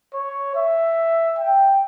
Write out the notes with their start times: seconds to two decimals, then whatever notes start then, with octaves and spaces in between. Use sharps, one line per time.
0.13 C#5
0.55 E5
1.39 G5